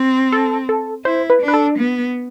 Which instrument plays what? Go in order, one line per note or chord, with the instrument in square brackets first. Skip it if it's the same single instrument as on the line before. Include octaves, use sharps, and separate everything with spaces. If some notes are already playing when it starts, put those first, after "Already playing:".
Already playing: [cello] C4
[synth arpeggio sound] A4
A4
[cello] E4 [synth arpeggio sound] C5
[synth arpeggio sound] B4
[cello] D4
[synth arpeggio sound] B4
A4
[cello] B3